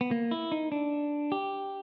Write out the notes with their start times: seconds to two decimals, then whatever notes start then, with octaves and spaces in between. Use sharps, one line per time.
0.01 B3
0.11 A#3
0.31 E4
0.52 D#4
0.72 D4
1.32 G4